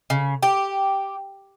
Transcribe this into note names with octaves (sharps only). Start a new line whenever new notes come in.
C#3
G4